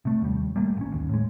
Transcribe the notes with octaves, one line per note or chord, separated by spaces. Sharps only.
C3 A3
D#2 G3
G3 A3 A#3
G#1 C#4
D#2
A2 G#3